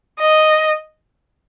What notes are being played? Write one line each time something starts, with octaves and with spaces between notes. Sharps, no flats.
D#5